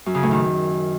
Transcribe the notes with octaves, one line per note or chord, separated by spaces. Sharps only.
F#2
C#3
A2
D#3